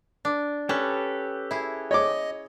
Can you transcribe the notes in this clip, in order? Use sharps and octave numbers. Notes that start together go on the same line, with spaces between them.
D4
C#4 G4 A4 B4
E4 G#4
C#5 D#5 D6